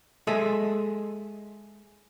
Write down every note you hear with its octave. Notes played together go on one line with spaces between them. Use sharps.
G#3 G#4 A4 D#5 E5